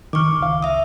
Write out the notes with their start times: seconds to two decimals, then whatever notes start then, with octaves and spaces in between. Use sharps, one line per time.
0.13 D#3 C#6 D6 F6
0.41 C#2 F5
0.62 E5 D#6